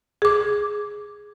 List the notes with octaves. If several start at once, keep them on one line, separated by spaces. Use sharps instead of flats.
G#4 D6